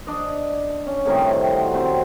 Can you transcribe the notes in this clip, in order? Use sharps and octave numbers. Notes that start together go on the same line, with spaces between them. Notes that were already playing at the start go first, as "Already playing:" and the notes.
D4 D5 D#5
C#4
A2 C3 D#3 G3
F#4 C5
D#3 C4 C5